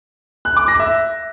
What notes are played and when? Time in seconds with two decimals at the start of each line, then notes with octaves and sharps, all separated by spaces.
0.45 F#6
0.57 D6
0.68 A#6
0.79 E5